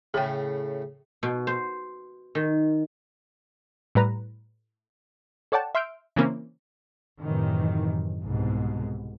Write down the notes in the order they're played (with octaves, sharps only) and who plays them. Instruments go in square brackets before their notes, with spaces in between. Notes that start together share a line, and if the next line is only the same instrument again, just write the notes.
[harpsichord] A2 C#3 [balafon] G#4 G5
[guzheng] B2
C5
D#3
[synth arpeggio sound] A2 G3 B4 A#5
A4 C#5 D5 F#5 G5 A5
E5 C6 F6 G6 D7
C#3 E3 A#3 C4 C#4
[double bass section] F#2 A2 C3 D#3 E3
C2 G#2 B2